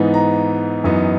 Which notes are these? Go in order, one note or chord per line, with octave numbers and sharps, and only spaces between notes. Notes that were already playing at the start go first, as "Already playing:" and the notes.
Already playing: G#2 E3 B3 D#4
A#5
F#2 E3 B3 D#4